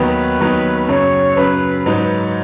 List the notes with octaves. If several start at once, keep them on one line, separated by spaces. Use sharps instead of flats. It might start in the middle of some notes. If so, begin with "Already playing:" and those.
Already playing: D#2 D#3 F#3 B3 D#4 B4
D#2 D#3 F#3 B3 D#4
F#2 C#3 F#3 C#5
F#2 C#3 F#3 B4
G#2 F#3 D#4 B4